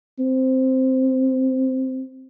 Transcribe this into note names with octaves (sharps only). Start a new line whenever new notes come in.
C4